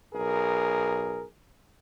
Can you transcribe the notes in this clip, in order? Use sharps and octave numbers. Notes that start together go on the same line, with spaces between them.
B1 G#4 A#4